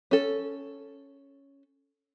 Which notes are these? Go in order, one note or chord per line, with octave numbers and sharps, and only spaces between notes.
C#4 A4